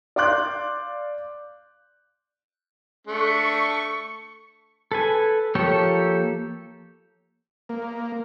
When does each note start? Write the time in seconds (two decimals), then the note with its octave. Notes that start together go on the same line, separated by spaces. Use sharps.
0.16 D5 F5 C6 D6 F#6 G6
3.07 A3 D4 C#6
4.92 A4 B4 G#5
5.55 F3 A#3 G4 A4 C#5
7.69 A#3